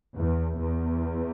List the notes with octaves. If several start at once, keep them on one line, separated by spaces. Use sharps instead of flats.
E2
E2